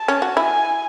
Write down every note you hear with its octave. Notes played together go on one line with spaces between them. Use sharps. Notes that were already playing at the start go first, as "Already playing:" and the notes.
Already playing: A5
C#4
F#4
E4 G#5